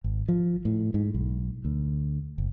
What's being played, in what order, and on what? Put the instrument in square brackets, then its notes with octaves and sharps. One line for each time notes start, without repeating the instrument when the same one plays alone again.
[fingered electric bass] G#1
F3
A2
G#2
B1
D2
F#1